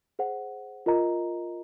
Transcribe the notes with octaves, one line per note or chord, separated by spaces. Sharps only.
G#4 C5 F#5
F4 A#4 D#5 A#5